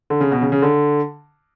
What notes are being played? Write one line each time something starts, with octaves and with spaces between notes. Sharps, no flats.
D3
C#3
B2
C#3
C#3
D3